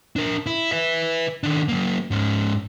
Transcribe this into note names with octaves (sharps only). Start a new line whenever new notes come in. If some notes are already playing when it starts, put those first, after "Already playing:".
D4 A#4
E4
B4 E5
D#3 D4
F#3 A#3
G#2 C#4